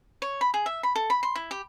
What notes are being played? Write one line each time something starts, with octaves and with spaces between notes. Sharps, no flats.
C#5
B5
G#4
E5
B5
A4
B5
C6
E4
G4